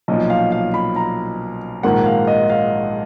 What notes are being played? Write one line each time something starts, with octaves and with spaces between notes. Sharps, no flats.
B1 A#2 F3 D#5
F5
F5
B5
A#5
A#1 G#2 D#3 A#3 F#5
F5
D#5
F5